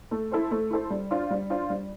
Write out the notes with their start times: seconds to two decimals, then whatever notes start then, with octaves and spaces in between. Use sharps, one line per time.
0.11 A3
0.31 E4 A4 C5
0.51 A3
0.70 E4 A4 C5
0.90 G3
1.11 D4 F4 C5
1.31 G3
1.50 D4 F4 C5
1.70 G3